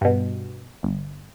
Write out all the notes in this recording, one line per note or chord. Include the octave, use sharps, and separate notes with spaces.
G2 B2
G1